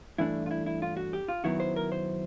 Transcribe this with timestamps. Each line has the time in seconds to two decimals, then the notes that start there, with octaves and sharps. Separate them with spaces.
0.18 G2 E3 A3 D4 E4
0.46 F4
0.51 E4
0.66 E4
0.82 F4
0.97 F#4
1.13 G4
1.28 F4
1.44 F#2 D#3 F#3 B3 E4 F#4
1.60 C5
1.76 A#4
1.92 C5